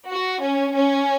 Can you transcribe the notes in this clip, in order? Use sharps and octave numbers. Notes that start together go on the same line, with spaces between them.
F#4
C#4
C#4